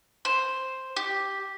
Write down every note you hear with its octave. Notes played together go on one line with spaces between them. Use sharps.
C5
G4